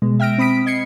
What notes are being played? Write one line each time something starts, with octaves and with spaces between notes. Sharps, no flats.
B2 G#3
E5 G5 F6 A#6 D7
C4 B5 D#6 B6 D7
D#5 G#6 C7 C#7